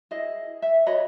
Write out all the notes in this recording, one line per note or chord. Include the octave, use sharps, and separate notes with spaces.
E4 G#4 D#5
E5
F#4 C#5 D#5 B5